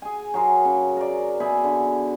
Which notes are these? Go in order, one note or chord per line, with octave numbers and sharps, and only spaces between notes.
G#4 G#5
F#3 G#4 A#4 C5
C#3
A#4 D5
B2 G#4 E5 B5
D3